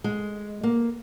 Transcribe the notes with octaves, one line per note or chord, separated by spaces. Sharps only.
G#3
A#3